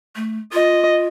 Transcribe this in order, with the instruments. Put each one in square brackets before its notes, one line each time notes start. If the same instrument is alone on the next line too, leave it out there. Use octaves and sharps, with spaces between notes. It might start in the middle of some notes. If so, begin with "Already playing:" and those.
[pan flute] A3
[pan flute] F4 [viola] D#5